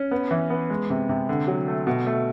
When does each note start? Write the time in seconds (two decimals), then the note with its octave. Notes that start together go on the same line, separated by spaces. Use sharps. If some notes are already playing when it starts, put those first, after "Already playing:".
Already playing: C#4
0.11 B3
0.31 E3
0.50 B3
0.70 G#3
0.90 C3
1.09 C3
1.29 D3
1.47 F#3
1.68 A3
1.87 B2
2.07 A3